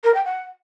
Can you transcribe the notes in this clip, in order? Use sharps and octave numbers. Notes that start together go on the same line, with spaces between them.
A#4
G5
F#5